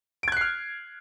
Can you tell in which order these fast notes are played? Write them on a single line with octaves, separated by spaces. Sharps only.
D7 G#6 F#6 C7 F6